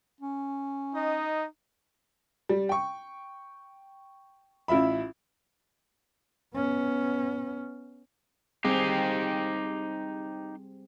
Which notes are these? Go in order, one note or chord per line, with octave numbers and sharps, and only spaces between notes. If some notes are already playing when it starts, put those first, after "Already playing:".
C#4
D#4 D#5
G3
G5 C#6
A1 E4 F4 E5 B5
B3 C#4
G3 C4 D#4 G4 G#4